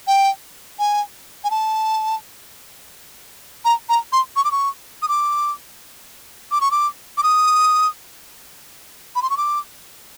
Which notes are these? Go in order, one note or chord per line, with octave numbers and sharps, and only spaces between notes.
G5
G#5
G#5
A5
A#5
A#5
C6
C#6
D6
C#6
D#6
D6
D6
C#6
D6
D6
D#6
B5
C6
C#6
D6